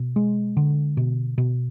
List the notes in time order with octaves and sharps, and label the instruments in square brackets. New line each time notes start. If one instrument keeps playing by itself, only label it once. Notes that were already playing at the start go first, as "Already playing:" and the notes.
Already playing: [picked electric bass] B2
G#3
D3
B2
B2